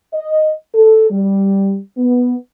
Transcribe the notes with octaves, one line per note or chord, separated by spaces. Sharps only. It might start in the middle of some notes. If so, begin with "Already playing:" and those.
D#5
A4
G3
B3